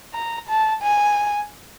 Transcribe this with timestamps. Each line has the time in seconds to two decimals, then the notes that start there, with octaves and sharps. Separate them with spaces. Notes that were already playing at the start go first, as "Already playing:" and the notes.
0.14 A#5
0.49 A5
0.83 G#5